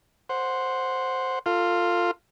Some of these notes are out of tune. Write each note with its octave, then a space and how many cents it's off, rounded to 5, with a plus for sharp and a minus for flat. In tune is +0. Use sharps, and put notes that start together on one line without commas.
C5 +0 F#5 -10
F4 +0 A4 +30